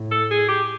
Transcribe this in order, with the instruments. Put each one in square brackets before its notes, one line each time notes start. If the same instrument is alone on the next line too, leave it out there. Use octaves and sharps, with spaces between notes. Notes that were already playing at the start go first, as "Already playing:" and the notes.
Already playing: [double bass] A2
[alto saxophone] A4
G#4
G4